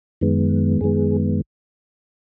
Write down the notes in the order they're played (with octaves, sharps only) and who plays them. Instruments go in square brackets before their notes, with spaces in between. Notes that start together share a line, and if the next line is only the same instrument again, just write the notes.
[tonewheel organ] F#2 D#3 G#3 B3
F#2 D#3 G#3 B3 G#4